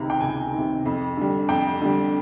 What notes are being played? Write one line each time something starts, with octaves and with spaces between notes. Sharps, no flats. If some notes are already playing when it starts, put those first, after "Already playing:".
Already playing: C#2 C3 D#3 A#5
G5
C#2 G#5
C3 D#3
F2
D3 G3
F2 G5
D3 G3